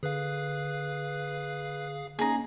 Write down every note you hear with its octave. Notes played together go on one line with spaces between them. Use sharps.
D3 G#4 B4 F5
A#3 C#4 D#4 G#4 A#5